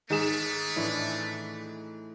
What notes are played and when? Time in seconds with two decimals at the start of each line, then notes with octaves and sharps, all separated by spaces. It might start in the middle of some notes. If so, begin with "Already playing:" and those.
0.10 G#2 D#3 G#3 A3 G#4 E7
0.76 A2 E3 D4